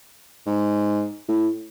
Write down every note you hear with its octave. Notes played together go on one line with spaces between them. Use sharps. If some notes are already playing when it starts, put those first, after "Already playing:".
G#2
A2